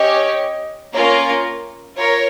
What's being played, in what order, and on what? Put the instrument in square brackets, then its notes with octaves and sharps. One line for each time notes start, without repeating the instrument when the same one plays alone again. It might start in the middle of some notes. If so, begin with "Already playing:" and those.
Already playing: [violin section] C#4 G4 C#5 [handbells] D#5
[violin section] A#3 C#4 F4 A#4 [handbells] C#5
[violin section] F4 A#4 C#5